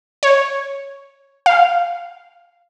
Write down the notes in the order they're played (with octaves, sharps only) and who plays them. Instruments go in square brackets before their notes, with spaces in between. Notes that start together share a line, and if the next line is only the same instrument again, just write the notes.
[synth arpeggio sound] C#5
F5